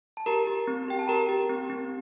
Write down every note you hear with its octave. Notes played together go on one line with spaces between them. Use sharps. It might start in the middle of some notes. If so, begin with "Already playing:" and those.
A5
G4 A#4 A#5
G4
C4
G4 G5
A5
G4 A#4 A#5
G4
C4
C4